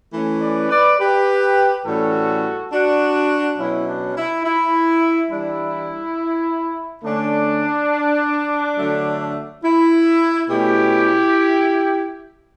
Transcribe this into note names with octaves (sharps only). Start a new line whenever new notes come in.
E3 A3 C#4
B4 D5
B4 D5
G4 B4
A2 E3 G3 C#4 F#4 A4
D4 F#4
B2 F#3 C#4 E4
D4
E4
E4
E3 G3 D4 E4
D3 A3 C#4 D4
D3 F#3 A3
E4
B2 A3 C#4 E4 G4